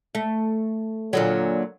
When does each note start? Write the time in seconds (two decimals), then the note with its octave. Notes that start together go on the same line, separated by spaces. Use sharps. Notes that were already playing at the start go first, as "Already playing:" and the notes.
0.15 A3
1.13 A#2 D3 F#3